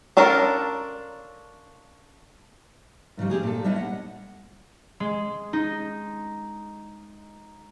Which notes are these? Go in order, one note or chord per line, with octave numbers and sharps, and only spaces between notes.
C#4 D4 F4 A4 A#4
G#2 C#3 F3 G3
C4 D4 G4 G#4
A#2 A4
G3 B3 D4 E4 C#5 D#5
F#5
G#3
D#4